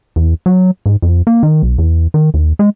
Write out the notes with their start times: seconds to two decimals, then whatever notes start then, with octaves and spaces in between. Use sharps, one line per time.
0.16 E2
0.46 F#3
0.86 G#2
1.02 F2
1.27 A#3
1.43 D#3
1.63 B1
1.78 E2
2.14 D#3
2.34 D#2
2.59 G#3